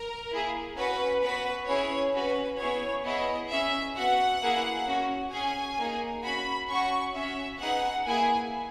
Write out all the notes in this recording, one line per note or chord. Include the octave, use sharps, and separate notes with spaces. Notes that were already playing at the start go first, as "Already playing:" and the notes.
Already playing: A#4
A#3 E4 G#4
C#4 F#4 B4
B3 F#4 B4
C#4 E4 G#4 C#5
C#4 F#4 B4
B3 E4 G#4 C#5
B3 E4 G#4 D#5
C#4 G#4 E5
B3 F#4 F#5
A#3 E4 G#4
C#4 F#4
C#4 G#4 G#5
A#3 D#4 G#4
C#4 F#4 B5
C#4 F#4 C#6
C#4 F#4 E5
B3 D#4 G#4 F#5
A#3 E4 G#4 G#5